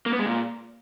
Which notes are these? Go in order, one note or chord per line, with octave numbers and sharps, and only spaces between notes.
A#3
B3
G#3
A#2